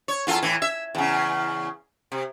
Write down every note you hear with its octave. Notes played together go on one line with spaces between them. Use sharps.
C#5
E2 F4 A4
A2 E3
E5
E2 C#3
C3